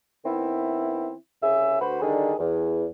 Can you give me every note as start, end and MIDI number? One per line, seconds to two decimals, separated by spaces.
0.25 1.13 51
0.25 1.13 59
0.25 1.13 60
0.25 1.13 64
1.43 1.76 36
1.43 1.76 49
1.43 1.76 68
1.43 1.76 76
1.81 2.00 38
1.81 2.00 66
1.81 2.00 71
1.81 2.00 72
1.81 2.00 83
2.01 2.33 50
2.01 2.33 51
2.01 2.33 55
2.01 2.33 62
2.01 2.33 63
2.01 2.33 68
2.39 2.86 40